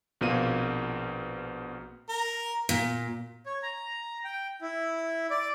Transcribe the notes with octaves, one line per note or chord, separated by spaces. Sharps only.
A#1 B2 A#3 C4 F4 D#7
A#4
A#2
C#5
A#5
G5
E4
D5